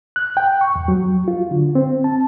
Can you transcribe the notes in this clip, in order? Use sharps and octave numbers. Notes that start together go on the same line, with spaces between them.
F#6
G5
C#6
E2
F#3
F4
D3
C4
A5